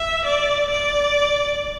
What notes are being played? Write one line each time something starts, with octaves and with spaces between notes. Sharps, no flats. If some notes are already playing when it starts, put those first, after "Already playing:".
Already playing: E5
D5
D5